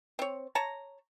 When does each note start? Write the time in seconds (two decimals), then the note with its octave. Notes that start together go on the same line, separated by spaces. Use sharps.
0.19 C4 C#5
0.55 C#5 A5 A#5